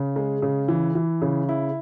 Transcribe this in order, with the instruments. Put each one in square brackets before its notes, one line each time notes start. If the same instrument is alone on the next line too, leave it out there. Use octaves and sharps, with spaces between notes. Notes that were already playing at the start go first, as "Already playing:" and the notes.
Already playing: [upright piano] C#3
G#3
C#3
E3
E3
C#3
E4